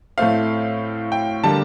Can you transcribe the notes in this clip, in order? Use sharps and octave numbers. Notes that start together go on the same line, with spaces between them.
A2 A3 C4 F5
G5
D3 G3 A#3 A5